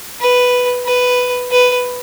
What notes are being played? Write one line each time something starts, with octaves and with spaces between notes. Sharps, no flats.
B4
B4
B4